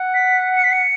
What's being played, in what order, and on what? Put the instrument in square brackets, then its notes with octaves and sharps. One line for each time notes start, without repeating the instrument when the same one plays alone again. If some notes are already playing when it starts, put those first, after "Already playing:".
Already playing: [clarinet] F#5
[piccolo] B6
C#7
B6
C#7